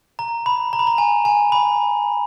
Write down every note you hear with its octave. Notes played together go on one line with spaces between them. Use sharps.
A#5
B5
A#5
B5
A#5
G#5
G#5
B5